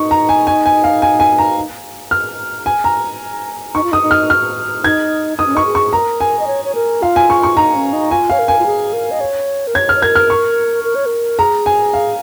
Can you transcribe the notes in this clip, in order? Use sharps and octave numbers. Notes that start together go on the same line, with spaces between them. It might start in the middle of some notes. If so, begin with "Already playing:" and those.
Already playing: D#4 C#6
A#5
G#5
G#5
G#5
F5
G#5
G#5
A#5
F6
G#5
A#5
D#4 C#6
F4
D#4 D#6
D#4
F6
F6
D#4 G#6
D#4 D#6
C#4
D#4 C#6
G#4
C#6
A#4 A#5
G#5
D#5
C#5
C#5
A#4
F4 F5
G#5
C#6
C#6
D#4 A#5
C#4
D#4
F4 G#5
C#5 F5
A#4
G#5
F4
G#4
A#4
D#5
C#5
A#4
C#5 G#6
F6
C#5
A#4 G#6
F6
C#6
A#4
C#5
A#4
G#4 A#5
G#5
F5